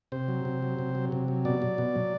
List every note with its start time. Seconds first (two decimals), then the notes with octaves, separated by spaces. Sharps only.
0.12 C3 C5
0.28 F#3
0.45 C3
0.62 F#3
0.79 C3
0.95 F#3
1.12 C3
1.28 F#3
1.45 B2 D5
1.62 F#3
1.78 B2
1.96 F#3